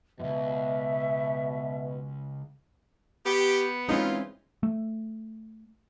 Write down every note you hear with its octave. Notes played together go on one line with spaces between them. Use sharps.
C#2 F#2 B2 E5
B3 G4
E3 G#3 C4 C#4 D#4 F4
A3